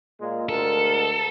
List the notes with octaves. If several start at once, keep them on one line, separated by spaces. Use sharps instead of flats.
A#2 G#3 A#3
D2 G#3 A4 A#4